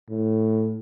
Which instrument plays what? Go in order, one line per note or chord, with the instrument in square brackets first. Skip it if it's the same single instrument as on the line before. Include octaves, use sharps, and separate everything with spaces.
[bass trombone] A2